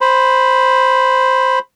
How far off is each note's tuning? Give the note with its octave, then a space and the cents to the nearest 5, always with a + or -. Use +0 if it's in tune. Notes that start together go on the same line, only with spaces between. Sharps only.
C5 +0 B5 +0